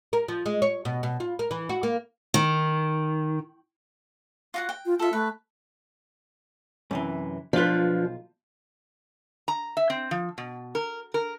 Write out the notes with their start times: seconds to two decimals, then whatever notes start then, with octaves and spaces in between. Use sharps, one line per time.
0.13 A#4
0.28 F3
0.46 G#3
0.62 C#5
0.85 B2
1.03 B2
1.20 F4
1.39 A#4
1.51 E3
1.69 F#4
1.83 A#3
2.34 D#3
4.54 F4 F#4 F#5
4.69 G5
4.86 F4
4.99 F4 A4 E5
5.13 A3 B4
6.91 F#2 C3 E3
7.53 B1 F3 D4 F4 B4
9.48 A#5
9.77 E5
9.90 C4
10.11 F3
10.38 B2
10.75 A#4
11.14 A#4